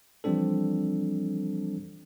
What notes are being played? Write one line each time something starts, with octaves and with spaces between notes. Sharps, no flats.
E3 F3 G3 C4 D4 A4